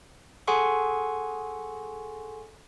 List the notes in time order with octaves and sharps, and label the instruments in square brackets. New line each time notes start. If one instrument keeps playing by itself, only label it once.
[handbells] G#4 A4 F#5 G#5 C6 C#6